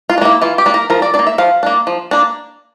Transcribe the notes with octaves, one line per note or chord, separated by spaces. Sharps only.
F4
D4
A#3 E4
E3 F4
G4
A#3 D4
A#4
F3 A#4
D5
D4 D5
A#3
E5
F3 F5
A#3 D4
F3
A#3 D4